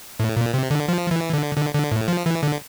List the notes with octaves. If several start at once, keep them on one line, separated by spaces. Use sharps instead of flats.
A2
A#2
C3
D3
F3
E3
D3
D3
D3
A2
F3
E3
D3